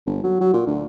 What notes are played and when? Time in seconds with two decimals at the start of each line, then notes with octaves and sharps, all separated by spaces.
0.06 G1
0.24 F#3
0.41 F#3
0.54 A#2
0.67 D2